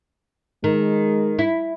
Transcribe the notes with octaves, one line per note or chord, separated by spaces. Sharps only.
D#3 G#3
E4